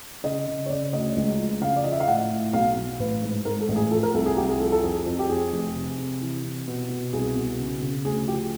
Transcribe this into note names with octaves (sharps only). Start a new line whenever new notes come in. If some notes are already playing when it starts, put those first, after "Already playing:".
C#3 D#5
C#3
C#5
C#3 D5
D2 D#5
C#2
F3
C#3 F5
D5
F3 D#5
E5
F5
A2 F#5
A2
B1 F5
B1
A1 B4
G#2
G#2 A#4
A4
A1
G#4
F3 A4
A#4
C2 A4
G#4
C2 G4
G#4
F3 A4
A4
F2 G#4
F2
G4
F2 G#4
F1
C3
C3
E3
C3
B2
B2
C2 G#4
B2
C#3
C#3
D2 G#4
F3 G4